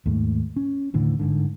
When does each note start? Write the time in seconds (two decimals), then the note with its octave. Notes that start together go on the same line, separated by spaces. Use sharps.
0.06 D#2 G#2 A3
0.56 C#4
0.94 D#2 A2 D3 E3
1.19 G1 G#2 D3